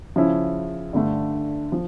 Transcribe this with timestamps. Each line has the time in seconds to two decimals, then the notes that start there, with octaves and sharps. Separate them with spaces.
0.16 C#3 F3 C#4 E4
0.93 G2 D3 A3
1.72 F3